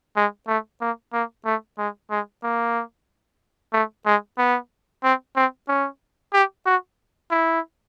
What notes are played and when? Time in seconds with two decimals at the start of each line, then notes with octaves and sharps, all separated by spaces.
0.16 G#3
0.48 A3
0.81 A#3
1.13 A#3
1.45 A3
1.78 G#3
2.11 G#3
2.43 A#3
3.73 A3
4.06 G#3
4.38 B3
5.04 C4
5.36 C4
5.68 C#4
6.34 G4
6.66 F#4
7.31 E4